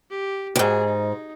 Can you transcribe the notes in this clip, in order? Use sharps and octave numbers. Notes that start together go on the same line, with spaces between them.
G4
D#2 G#2 F#4 G#4
D#4